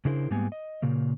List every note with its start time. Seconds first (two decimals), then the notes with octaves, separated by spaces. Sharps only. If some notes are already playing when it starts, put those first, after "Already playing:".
0.05 C#3 D4 E4 G#4 A#4 C5
0.30 G#2 G3 A#3 B3 G#5
0.52 D#5
0.82 A#2 C#3 A#3